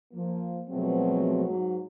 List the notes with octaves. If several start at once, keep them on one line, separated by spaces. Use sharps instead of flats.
F3 A#3
B2 F3 F#3 G#3 A3 C4
G#2 F#3